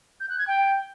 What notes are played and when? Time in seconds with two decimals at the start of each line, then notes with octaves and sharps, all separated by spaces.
0.20 G6
0.29 F#6
0.38 G#6
0.48 G5